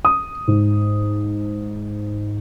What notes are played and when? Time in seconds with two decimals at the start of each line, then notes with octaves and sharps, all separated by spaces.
0.05 D#6
0.48 G#2